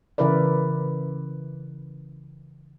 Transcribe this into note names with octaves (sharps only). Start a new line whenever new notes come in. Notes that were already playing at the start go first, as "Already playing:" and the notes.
C#3 E3 E4 A#4 B4 D5